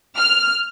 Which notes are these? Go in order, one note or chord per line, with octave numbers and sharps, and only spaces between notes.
F6